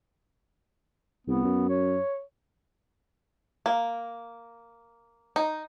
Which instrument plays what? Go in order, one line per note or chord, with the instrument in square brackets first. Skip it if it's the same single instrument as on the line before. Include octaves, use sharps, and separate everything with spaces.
[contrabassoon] C2 [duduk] B3
[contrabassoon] F#2
[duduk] C#5
[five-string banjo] A#3
D#4